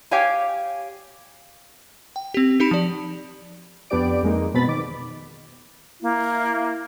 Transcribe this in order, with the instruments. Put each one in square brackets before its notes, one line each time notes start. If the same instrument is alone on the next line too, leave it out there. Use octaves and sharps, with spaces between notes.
[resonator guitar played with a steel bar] G4 C#5 F5 G5 G#5
[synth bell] G5
C4 G4
D#4 G4 B5 D7 E7
F3 D5
[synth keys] F2 B3 D4 G4 D5 D7
F2 G#3 A#3 D#4
B2 B3 C4 B5 A6
D#3 D6
[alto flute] A#3 [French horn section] E4